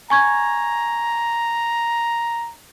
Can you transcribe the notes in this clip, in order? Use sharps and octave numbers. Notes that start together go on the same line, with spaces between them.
G#5 A#5 C#6 G#6